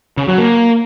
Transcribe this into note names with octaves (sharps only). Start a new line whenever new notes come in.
C#3
F#3
A#3